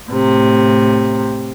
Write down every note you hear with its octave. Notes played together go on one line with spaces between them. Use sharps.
A2 C3